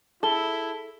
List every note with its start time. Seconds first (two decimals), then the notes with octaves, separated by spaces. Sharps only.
0.23 E4 G#4 A4 A5 G7